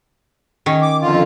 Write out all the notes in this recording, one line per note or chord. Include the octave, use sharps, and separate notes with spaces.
D#3 C#4
D6
F2 D3 F4